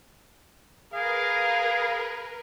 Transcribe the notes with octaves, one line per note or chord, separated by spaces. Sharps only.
G#4 A#4 B4 F5